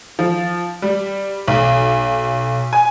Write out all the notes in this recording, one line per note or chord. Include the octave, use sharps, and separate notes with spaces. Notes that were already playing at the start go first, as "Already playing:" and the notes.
F3
G3
B1
G#5